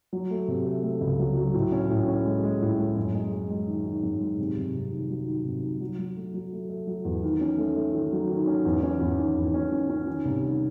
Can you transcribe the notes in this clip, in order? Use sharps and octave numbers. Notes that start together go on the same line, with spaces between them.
F#3
A3
C3
A3
A3
C#2
F#3
F#3
A2
C#4
A2
C#4
G#3
G#3
A2
G#3
F#2
G#3
G#3
G#3
D#3
D#3
F#2
G#3
C3
C2
C3
D#3
F#3
D#3
C3
D#3
F#3
F#3
A3
F#3
A3
A3
F#3
E2
D#3
C#4
A3
A3
D#3
F#3
D#3
C#4
E2
C#4
E2
D#3
E2
C#4
C#4
C#4
D#3
C2
D#3